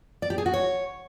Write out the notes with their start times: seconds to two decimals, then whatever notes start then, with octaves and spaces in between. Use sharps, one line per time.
0.22 D5
0.30 G4
0.38 G#4
0.46 F#4
0.54 C#5